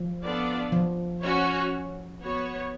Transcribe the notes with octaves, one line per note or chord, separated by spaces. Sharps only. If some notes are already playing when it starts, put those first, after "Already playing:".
Already playing: F3
B3 D4 F4 A4 D5
F3
C#4 F#4 C#5
B3 F#4 C#5